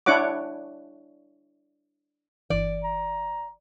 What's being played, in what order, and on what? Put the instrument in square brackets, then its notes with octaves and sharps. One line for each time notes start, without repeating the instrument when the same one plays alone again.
[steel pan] D4 E4 C#5 F#5 D6
[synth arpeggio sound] G1 E3 [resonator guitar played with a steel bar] D5
[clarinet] A#5